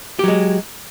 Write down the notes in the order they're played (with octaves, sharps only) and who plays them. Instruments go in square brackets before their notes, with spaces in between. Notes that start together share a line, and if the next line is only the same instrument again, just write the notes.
[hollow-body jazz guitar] G4
F#3
G#3